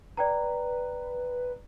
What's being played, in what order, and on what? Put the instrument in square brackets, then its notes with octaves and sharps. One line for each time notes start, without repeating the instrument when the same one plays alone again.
[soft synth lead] B4 [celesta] D5 G5 A#5